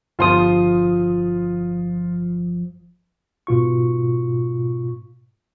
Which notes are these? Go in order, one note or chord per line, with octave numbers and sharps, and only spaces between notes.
G1 F3 F4 C6 D#6
G#2 B2 F4 C#6